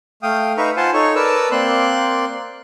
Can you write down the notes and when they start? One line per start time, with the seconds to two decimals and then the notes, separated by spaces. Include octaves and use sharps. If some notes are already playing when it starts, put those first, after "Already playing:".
0.23 A3 F5 G5 D#6
0.57 D#4 B4 E5 F5 A#5 C#6
0.77 F4 C5 F#5 G#5 A5 C6
0.94 D#4 A4 C#5 C#6
1.15 A#4 B4 D5 A5 E6
1.51 A#3 C4 D5 C6 F#6